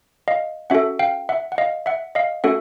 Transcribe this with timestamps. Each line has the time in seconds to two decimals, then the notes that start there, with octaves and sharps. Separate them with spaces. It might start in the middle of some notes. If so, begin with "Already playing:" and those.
0.28 D#5 F5
0.70 C#4 F#4 A4 E5 F#5
0.99 F5 G5
1.29 E5 F#5
1.52 F#5
1.58 D#5 F5
1.86 E5 F#5
2.15 D#5 F5
2.44 A3 C#4 F#4 A4 E5 F#5